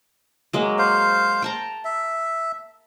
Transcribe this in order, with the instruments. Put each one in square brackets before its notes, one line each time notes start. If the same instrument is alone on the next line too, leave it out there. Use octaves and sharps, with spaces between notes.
[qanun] F#3 G#3 A#3
[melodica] C5 F5
[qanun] G5 A5 A#5
[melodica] E5